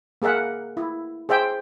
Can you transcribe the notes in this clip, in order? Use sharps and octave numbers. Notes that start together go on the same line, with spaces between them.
A#3 G#4 A#4 E5 F#5
E4
G#4 C5 E5 G5